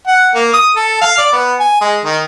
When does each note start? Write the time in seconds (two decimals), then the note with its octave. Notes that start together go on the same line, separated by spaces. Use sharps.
0.07 F#5
0.35 A#3
0.53 D#6
0.76 A4
1.01 F5
1.18 D5
1.33 B3
1.60 G#5
1.81 G#3
2.05 D#3